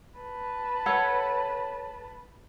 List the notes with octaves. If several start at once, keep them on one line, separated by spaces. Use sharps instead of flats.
B4 A5
A4 C#5 F#5